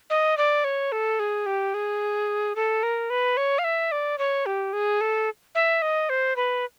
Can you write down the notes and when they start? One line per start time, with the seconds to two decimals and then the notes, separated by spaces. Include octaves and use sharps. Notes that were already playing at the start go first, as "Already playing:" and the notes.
0.10 D#5
0.38 D5
0.64 C#5
0.92 A4
1.19 G#4
1.46 G4
1.74 G#4
2.56 A4
2.83 A#4
3.10 B4
3.37 C#5
3.59 F5
3.64 E5
3.92 D5
4.18 C#5
4.46 G4
4.73 G#4
5.01 A4
5.55 E5
5.82 D#5
6.10 C5
6.36 B4